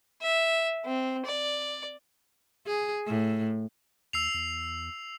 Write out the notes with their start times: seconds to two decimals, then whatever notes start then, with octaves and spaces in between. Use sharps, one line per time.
0.22 E5
0.86 C4
1.25 D5
2.67 G#4
3.07 A2
4.13 D#2 E6 C7 F7
4.34 E2